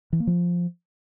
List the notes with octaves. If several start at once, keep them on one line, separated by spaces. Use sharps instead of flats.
E3
A#3
F3